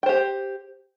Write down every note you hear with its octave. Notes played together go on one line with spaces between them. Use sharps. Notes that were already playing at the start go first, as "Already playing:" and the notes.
G4 C5 G5